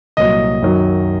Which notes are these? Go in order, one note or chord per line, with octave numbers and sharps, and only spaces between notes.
C2 A#2 F#3 D#5
F#2 D#3 F#3